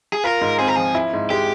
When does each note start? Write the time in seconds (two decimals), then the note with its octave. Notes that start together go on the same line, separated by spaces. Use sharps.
0.13 G#4
0.24 F4 A#4
0.41 G#2
0.59 C4 G#4
0.68 A#4
0.76 F3 G#4
0.95 E4
1.13 G#2
1.30 G#3 G4